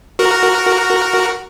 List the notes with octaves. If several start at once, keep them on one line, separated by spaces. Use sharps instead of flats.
F#4 A#4